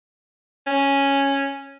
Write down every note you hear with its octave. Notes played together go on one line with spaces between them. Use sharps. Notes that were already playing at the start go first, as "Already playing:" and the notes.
C#4